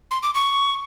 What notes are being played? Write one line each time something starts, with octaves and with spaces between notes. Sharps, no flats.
C6
D6
C#6